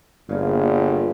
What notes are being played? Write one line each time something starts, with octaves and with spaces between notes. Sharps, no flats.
G1 A#2 C#3